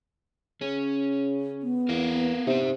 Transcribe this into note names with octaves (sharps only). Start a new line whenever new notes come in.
C#3 C#4
B3
E2 A#4 B4 F5
C3 D#4 C5